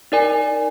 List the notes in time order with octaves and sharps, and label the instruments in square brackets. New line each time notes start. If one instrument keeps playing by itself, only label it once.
[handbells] D#4 A#4 D5 G#5